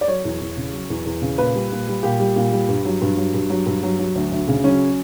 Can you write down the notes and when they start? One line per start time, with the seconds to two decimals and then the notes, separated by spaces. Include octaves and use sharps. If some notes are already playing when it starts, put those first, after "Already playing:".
0.01 D5
0.08 F#3 C#5
0.25 E2
0.41 E2
0.57 C#3
0.73 F#3
0.90 E2
1.06 E2
1.22 C#3
1.38 A#2 B4
1.55 G3
1.71 A#2
1.88 G3
2.03 A#2 G4
2.20 G3
2.36 A#2
2.53 G3
2.68 G2
2.85 F#3
3.01 G2
3.17 F#3
3.34 G2
3.50 F#3
3.66 G2
3.83 F#3
3.99 F#3
4.15 D2
4.32 D2
4.48 C#3
4.64 F#3 C#4